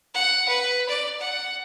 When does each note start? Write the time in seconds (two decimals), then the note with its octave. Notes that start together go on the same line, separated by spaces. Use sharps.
0.14 F#5
0.48 B4
0.89 D5
1.20 F#5